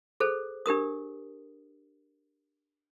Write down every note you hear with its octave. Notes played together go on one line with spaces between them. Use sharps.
G#4 A4 C5
D4 G4 A#4 D#6